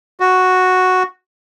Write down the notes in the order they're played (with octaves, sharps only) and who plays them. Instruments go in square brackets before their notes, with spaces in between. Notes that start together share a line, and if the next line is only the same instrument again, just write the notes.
[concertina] F#4